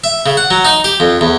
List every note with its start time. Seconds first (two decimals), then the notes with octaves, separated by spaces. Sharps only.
0.04 E5
0.26 C#3
0.37 F#5
0.51 F#3
0.65 D#4
0.84 G4
1.00 F2
1.21 E2